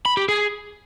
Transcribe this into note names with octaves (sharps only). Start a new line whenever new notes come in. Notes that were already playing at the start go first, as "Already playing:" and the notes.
B5
G4
G#4